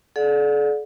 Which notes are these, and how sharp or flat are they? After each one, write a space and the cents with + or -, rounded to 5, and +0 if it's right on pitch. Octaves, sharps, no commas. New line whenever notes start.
A4 -45 D5 +0 F#5 -45